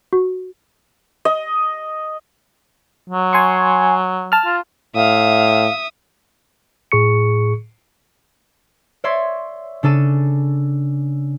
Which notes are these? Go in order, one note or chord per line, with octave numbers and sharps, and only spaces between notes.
F#4
D#5
F#3
G#5 C6 C#6
A5 F6
F4
A2 E5 F5 D#6
A2 G#4 C#6 C#7
C#5 D5 E5 C6 G#6
C#3 D4 A4 D#7 E7